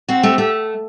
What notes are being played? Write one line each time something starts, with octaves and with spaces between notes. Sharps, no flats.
C4 F#4
A3 G4
A3 G4